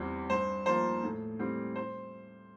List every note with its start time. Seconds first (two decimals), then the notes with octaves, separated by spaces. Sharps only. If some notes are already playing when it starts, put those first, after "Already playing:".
Already playing: E2 E3 G3 C4
0.30 G2 C5
0.66 F3 A#3 C5
1.03 A2
1.39 E3 G3 C4
1.76 C5